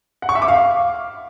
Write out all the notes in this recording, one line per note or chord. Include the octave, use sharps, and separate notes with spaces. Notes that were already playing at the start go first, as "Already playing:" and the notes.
F#5
C#6
E5
D6
F5